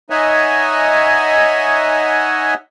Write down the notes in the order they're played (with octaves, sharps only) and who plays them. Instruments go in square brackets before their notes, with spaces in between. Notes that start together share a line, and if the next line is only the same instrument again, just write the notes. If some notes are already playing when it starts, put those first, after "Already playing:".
[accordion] D#4 C#5 D#5 E5 F#5 G#5